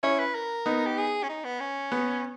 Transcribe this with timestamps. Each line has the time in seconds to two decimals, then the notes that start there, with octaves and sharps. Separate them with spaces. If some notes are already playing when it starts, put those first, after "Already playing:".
0.03 C#4 E4 C#5
0.19 B4
0.35 A#4
0.66 B3 D#4
0.86 G4
0.97 G#4
1.23 C#4
1.29 D#4
1.44 B3
1.60 C#4
1.92 B3